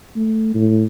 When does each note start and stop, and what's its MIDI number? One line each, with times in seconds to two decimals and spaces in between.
0.16 0.54 57
0.55 0.85 45